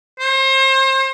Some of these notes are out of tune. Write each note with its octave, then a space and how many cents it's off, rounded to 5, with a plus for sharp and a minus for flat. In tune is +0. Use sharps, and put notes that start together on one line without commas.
C5 +35